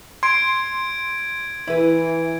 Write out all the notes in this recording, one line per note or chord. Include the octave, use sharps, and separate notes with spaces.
C6 G#6 D7
E3 E4 B4